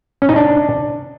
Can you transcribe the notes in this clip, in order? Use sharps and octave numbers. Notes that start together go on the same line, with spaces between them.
C#4
D#4
D4